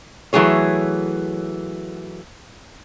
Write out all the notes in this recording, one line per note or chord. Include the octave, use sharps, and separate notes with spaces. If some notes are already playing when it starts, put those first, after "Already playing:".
E3 F#3 A3 G#4 C#5